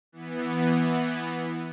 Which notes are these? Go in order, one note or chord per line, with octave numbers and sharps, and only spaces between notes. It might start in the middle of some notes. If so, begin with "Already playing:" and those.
E3 B3